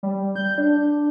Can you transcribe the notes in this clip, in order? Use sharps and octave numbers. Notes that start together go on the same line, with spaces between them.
G3
G6
D4